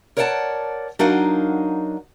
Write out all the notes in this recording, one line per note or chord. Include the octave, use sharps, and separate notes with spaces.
A#4 C#5 D5 F#5 G5 A5
F#3 D4 D#4 A#4 F5 F#5